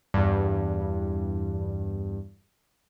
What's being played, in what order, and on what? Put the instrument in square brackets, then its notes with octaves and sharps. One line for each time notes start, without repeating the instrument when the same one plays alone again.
[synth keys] E2 G2